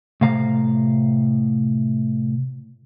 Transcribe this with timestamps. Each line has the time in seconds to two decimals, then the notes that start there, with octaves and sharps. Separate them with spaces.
0.21 A2 C3 F5 A#5